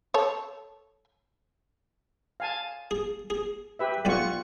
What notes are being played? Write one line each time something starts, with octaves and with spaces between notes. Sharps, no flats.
A4 C#5
F5 G#5 A5
G#4
G#4
G4 B4 E5
B1 F4 D5 F#5 G#5 C#6